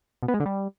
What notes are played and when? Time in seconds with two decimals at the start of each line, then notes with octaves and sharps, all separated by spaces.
0.23 B2
0.28 B3
0.34 G#3
0.40 D3
0.46 G3